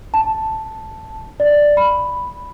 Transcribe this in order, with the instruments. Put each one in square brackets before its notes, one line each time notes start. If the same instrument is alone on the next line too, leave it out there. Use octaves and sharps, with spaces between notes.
[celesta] A5
D5
B5